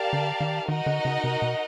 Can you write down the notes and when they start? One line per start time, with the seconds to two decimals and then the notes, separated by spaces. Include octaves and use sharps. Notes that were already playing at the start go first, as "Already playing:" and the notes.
Already playing: G4 A#4 D5 F5 A5
0.13 D3
0.41 D#3
0.68 D#3 D#4 F#4 A#4 D#5 F#5
0.86 D3
1.05 C#3
1.24 C3
1.42 B2